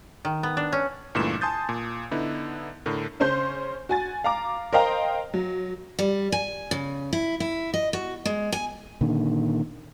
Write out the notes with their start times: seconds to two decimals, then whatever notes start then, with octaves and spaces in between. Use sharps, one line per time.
0.25 D#3
0.43 B3
0.57 D4
0.72 C#4
1.15 C#2 G2 A#2 E3 A3 E7
1.41 G#5 A5 C6 D#6 G6 A6
1.69 A#2
2.11 D3 B3 D#4 E4
2.86 A2 D3 A#4
3.20 C#3 C#4 C5 C6 G6
3.89 F#4 G#5 A6
4.24 F5 A#5 D6
4.73 A#4 C5 D#5 F5 G5 A#5
5.34 F#3
5.99 G3
6.32 G#5
6.71 C#3
7.13 E4
7.40 E4
7.74 D#5
7.93 F#4
8.25 G#3
8.52 G#5
9.01 A#2 D3 D#3